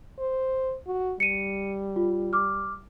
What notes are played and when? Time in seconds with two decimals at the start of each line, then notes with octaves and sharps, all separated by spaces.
0.19 C5
0.87 F#4
1.20 G3 C#7 D#7
1.96 F4
2.33 D6 F6